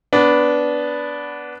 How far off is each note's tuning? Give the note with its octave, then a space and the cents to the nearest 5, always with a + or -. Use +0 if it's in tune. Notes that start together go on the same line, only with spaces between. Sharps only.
B3 -5 D4 -15